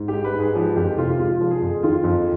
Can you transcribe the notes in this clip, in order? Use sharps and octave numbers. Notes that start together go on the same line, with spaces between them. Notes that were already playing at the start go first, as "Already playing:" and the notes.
Already playing: G#2
G4
G#3
B4
G#2 G#4
F3 G4
F2 G4
C3 F4
G#3 F4
F3
G#4
F2
D#3 F4
F2